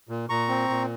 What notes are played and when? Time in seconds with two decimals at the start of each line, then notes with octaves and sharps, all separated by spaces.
0.09 A#2
0.29 A#2 A#5 C#6
0.49 C4
0.69 A#2